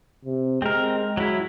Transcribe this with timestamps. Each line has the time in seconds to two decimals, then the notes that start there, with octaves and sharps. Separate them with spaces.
0.25 C3
0.62 G#3 C4 A#4
1.17 F#3 E4